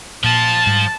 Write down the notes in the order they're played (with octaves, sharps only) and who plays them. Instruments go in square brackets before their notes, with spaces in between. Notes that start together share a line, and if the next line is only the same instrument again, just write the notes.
[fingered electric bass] A#2 [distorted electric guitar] F3 F4 [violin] A5
[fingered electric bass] G#2 G3